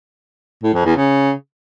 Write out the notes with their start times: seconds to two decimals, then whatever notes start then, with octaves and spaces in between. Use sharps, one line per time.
0.63 A2
0.74 F2
0.85 E2
0.96 C#3